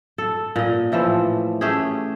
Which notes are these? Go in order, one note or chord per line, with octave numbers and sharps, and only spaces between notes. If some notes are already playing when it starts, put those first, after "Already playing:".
A4
A#2 D#5
A2 E3 F3 A4
A3 C#4 G4 G#4